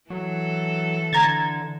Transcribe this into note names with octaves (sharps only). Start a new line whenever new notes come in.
E3 F#3 A4
D3 A#5 G#6 A6